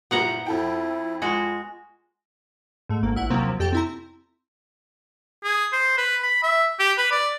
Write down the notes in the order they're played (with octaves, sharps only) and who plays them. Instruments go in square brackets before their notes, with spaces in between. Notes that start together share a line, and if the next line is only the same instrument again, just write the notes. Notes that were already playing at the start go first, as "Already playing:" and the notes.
[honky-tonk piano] F#1 A#2 G3 [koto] B3 F#5 A#5
[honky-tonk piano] F2 A4 G5 [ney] E4
[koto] G#3 F#4 [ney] F4
[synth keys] G#2 A3
G#1 D2 A#3
A#1 E4 F#5
D#2 C3 F3 F#3 A#3 C4
F2 G4 A4 G5 A6
C4 E4 A#5
[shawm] G#4
C5
B4
B5
E5
G4
B4
D5